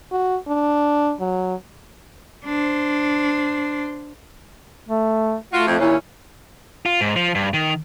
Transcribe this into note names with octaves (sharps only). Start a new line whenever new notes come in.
F#4
D4
F#3
D4 C5
A3
A3 F4 F#4
F2
D#2 A#2 C#4 E4
F4
G#2
F3
G2
D#3